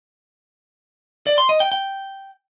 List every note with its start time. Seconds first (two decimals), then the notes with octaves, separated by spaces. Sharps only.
1.27 D5
1.38 C6
1.49 D#5
1.60 G5
1.72 G5